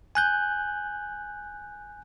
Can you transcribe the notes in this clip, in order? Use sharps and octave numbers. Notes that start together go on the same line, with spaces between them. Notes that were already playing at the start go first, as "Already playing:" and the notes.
G#5 F#6 G6